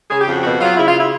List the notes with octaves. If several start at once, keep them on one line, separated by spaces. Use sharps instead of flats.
C#3 G#4
G4
F2
F#4
B2 F#4
F#3 F4
C#3 E4
F4
E4